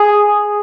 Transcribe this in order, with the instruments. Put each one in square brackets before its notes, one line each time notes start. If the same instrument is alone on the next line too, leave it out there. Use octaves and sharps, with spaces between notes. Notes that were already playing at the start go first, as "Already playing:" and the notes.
Already playing: [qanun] G#4